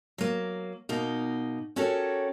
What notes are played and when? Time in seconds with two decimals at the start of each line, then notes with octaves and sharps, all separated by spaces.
0.18 F#3 A#3
0.89 B2 A#3 D#4
1.76 C#4 F#4 G4 A4 A#4 C#5